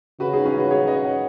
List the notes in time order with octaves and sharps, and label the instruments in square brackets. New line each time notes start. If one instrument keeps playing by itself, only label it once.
[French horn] C#3 [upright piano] F#4 B4
[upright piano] D#4 G#4
C#4 F#4
F#4 B4
G#4 C#5
B4 D#5
C#5 F#5